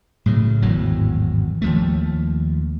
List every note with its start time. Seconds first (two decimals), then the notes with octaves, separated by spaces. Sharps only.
0.26 A2 C#3 F#3
0.62 G#1 E2 A2 F#3
1.62 D#2 F3 A3